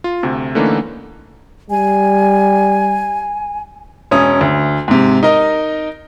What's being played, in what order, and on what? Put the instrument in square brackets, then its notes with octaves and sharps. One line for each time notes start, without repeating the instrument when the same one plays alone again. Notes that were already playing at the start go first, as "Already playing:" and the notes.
[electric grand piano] F4
D2 C3
D3 E3 A3 A#3 C#4 D#4
[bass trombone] G3 [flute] G#5
[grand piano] E1 C#4 D#6
D2
G#2 C3
D#4 A#4 D#5